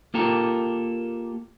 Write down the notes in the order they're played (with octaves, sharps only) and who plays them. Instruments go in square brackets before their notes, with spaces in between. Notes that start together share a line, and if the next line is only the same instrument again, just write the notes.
[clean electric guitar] A#3 F4 G4 A4 A#4